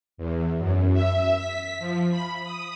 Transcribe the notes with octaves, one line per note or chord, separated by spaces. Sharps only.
E2
F#2
E5
B6
F3
B5
D#6